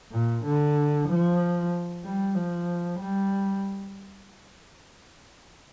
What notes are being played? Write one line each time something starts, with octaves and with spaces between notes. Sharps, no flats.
A#2
D3
F3
G3
F3
G3